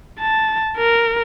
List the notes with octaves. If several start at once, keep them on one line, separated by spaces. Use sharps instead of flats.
A5
A#4